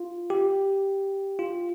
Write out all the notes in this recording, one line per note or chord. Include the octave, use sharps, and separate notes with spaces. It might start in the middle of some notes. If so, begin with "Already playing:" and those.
Already playing: F4
G4
F4